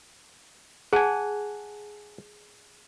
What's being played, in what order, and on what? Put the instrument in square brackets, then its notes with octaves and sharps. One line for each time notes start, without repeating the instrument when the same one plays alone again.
[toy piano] G#4 A5 [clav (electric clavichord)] F#5 G#5